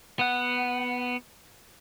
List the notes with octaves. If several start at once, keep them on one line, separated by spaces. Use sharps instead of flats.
B3 F#5